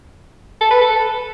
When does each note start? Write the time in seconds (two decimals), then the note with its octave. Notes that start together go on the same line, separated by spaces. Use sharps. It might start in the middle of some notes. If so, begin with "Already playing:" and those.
0.61 A4
0.71 B4
0.81 A4